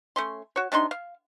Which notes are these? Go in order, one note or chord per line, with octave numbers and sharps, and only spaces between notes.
A3 C#4 C6
F#4 C#5
C3 D4 D#4 C6
F5